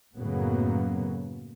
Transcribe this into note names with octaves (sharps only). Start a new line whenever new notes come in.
F#2 A2 C#3 F#3 A#3 B3